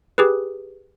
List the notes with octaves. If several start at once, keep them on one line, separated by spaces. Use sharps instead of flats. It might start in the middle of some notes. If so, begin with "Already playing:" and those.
G4 G#4 B4